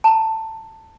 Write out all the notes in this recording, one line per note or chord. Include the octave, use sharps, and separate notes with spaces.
A5 A#5